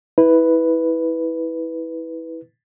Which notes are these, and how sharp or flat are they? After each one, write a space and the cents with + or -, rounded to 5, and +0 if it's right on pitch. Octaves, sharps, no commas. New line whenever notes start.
E4 -20 B4 +0